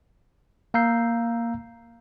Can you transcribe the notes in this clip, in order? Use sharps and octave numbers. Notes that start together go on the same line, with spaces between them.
A#3 F5 A#5 E6 G6 C7